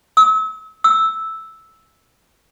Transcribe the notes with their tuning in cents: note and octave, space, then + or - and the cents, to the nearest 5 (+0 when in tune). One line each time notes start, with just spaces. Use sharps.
E6 -40
E6 -5